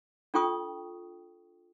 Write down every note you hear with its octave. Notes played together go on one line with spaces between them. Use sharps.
D4 F4 A4 G5 C#6 D#6